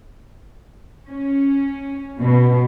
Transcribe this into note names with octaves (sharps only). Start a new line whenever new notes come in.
C#4
B2